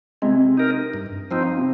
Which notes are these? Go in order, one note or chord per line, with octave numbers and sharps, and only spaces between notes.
C3 G#3
D#4 A#4
G2
F3 C4 D#4
C3